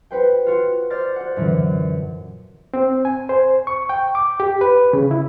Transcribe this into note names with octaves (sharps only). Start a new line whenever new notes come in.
F#4 B4 C5 G5
F4 F#4
C5 D5 F6 G6 A6 A#6
C5 F#5
F#2 A#2 D3 E3 F#3
C4
G#5
C5
C#6
G5
D6
G4
B4
C#3
E4